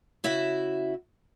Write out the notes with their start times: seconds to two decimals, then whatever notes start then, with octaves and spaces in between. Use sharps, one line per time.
0.24 C#3 E4 F#4 E5